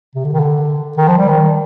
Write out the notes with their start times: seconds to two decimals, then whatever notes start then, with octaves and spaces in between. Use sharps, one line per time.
0.15 C3
0.25 D3
0.33 D#3
0.40 D3
0.97 D#3
1.08 F3
1.18 G3
1.28 D#3